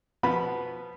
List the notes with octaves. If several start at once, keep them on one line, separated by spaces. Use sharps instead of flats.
B2 F3 B3 B5